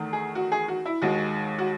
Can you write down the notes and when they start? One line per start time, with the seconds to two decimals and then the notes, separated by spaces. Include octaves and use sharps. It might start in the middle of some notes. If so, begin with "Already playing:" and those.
Already playing: E2 D#3 A3
0.13 G#4
0.35 F#4
0.52 G#4
0.68 F#4
0.85 E4
1.02 D#2 D#3 G#3 F#4
1.59 F#4